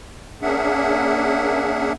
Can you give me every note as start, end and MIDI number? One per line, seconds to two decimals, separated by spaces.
0.42 1.93 58
0.42 1.93 61
0.42 1.93 62
0.42 1.93 68
0.42 1.93 76
0.42 1.93 78